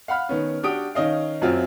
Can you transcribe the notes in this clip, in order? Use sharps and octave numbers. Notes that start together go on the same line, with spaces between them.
F5 F#5 B5 F6
D#3 B3 C#4
D4 F#4 G4 G5 D#6 D7
D#3 C#4 D#5 F5
F#2 F#3 C4 F4